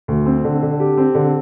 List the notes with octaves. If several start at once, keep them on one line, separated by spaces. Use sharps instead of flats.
D2
C4
D3
D3
G4
C4
D3